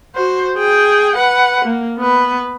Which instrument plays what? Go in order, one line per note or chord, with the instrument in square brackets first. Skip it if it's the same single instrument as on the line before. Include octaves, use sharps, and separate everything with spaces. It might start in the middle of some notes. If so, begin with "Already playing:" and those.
[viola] F#4 C5
G#4 G5
B4 F#5
A#3
B3 B4